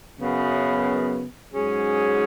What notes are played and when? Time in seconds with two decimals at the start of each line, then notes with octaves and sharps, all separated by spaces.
0.19 F#2 C#3 B3
1.52 G#2 F#3 C#4 G#4